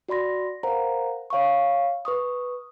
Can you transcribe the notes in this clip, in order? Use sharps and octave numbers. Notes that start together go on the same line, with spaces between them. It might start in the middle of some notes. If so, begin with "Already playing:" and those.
F#4 D5 B5 C6 A#6
A#4 C5 F5 F#5 A#5
C#5 F5 B5 C#6
B4 C#6 D#6